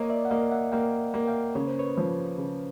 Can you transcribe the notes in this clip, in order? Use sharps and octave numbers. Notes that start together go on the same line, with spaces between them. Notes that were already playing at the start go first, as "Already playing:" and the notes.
Already playing: A#3 C#5 D#5
D5 E5
F#5
A#3 D#5 F5
E5 F#5
A#3 F5 G5
A#3
F5 G5
C#3 C#5
C5
B4 C#5
F3
C#3